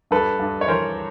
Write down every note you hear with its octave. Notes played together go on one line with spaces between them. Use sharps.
G2 A4 B4
G2
C#5
E3 A#4 C5